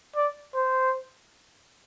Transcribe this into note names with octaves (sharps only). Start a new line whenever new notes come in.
D5
C5